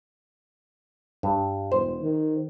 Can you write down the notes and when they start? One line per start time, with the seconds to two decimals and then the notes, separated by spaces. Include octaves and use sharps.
1.23 G2
1.72 E1 C5
2.02 D#3